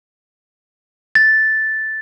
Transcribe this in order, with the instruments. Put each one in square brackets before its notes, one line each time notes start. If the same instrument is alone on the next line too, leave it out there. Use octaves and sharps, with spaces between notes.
[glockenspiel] A6